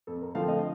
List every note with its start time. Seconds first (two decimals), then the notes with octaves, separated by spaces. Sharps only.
0.07 F2 A4
0.21 A#4
0.35 D3 F3 A3 C4 F5
0.48 D#5